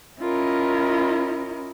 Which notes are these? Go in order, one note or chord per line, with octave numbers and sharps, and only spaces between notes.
C#4 E4 F4 A#4 D#5